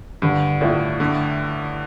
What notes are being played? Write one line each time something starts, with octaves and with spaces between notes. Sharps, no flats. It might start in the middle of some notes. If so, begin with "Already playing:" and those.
G2 D3
A2 A3 F4 A4 D5
D3 A3